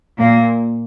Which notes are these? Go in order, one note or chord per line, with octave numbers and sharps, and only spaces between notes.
A#2 A#3